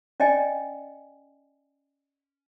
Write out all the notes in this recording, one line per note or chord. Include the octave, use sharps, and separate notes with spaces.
C#4 D5 D#5 G5 G#5